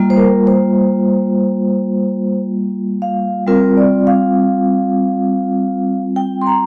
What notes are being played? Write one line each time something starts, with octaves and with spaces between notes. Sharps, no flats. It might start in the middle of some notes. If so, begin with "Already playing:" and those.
Already playing: G3 A#3 F4
C5
A#4
C5
F5
G3 C4 F4 A#4
D5
F5
G5
C6
A#5